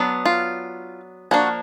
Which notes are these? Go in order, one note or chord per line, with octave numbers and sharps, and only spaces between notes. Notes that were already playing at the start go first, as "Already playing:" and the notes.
Already playing: F#3 B3 D4
F4
F3 A#3 D4 F#4